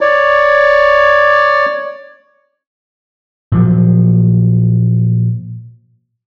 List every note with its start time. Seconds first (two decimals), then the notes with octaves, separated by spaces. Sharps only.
0.01 C#5 D5
3.52 A#2 F3 F#3